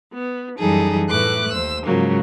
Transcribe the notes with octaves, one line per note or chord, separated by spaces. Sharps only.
B3
F#2 E3 G3 D#4 G#4 A4
A2 A3 B4 D6 F#6
D#2 C5 E6
G#2 C#3 F3 F#3 A#3